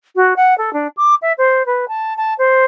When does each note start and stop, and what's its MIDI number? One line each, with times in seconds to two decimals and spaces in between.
0.16 0.34 66
0.36 0.57 78
0.58 0.73 69
0.73 0.88 62
0.97 1.15 86
1.22 1.33 76
1.38 1.66 72
1.66 1.85 71
1.88 2.14 81
2.17 2.34 81
2.39 2.65 72